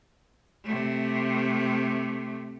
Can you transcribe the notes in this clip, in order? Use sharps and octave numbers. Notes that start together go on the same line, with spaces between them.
C3 A3